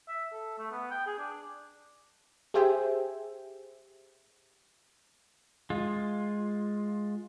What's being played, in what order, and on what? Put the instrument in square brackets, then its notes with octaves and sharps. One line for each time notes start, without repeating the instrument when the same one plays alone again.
[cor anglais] E5
A4
A3
B3
G5
G#4
D4
[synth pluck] G4 G#4 C5 E5 G5 G#5
[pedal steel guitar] G#3 F4